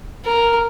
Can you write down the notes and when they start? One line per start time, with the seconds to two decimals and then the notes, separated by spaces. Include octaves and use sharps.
0.26 A#4